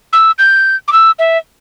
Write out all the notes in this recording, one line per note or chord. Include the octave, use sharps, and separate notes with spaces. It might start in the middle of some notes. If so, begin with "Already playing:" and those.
E6
G6
D6
E6
E5